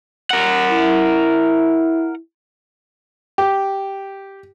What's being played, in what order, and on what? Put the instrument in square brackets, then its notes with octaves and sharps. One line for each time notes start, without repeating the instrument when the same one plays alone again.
[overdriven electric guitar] A#4 F#5
[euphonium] E4
[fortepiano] G4